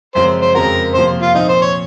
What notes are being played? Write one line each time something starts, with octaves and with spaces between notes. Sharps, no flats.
F#2 C#3 F3 G#3 C4 C5
C5
F2 C#3 G#3 C4 F#4 A#4
C3 F3 A#3 C5
F4
A#2 F3 C4 D#4
C5
C#5